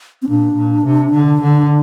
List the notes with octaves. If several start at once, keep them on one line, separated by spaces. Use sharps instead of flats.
C4
A#2 D4
A#2
C3
D3
D3